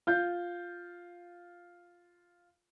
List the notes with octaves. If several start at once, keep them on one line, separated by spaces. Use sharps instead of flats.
F4 G6